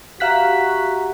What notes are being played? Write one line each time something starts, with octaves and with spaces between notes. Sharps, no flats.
F#4 G4 E5 F5 A#5 F#6 B6